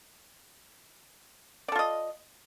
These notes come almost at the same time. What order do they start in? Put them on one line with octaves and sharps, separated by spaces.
D5 A4 F4 D#5